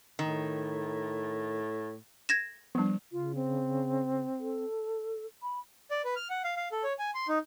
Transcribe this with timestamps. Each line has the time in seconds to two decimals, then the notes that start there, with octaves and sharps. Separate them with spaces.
0.19 A2 D#3
2.29 G#6 A#6 E7
2.75 F3 G3 B3 D4
3.12 C#3 F4
3.35 C4
4.40 A4
5.42 B5
5.91 D5
6.04 B4
6.16 F6
6.30 F#5
6.44 F5
6.57 F5
6.72 A4
6.83 C#5
6.99 G#5
7.14 C6
7.28 D#4